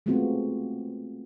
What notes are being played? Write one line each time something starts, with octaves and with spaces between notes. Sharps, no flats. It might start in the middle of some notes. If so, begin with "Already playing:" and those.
G#3 A3 B3 C4 F4 F#4